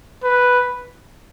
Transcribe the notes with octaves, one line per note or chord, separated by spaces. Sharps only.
B4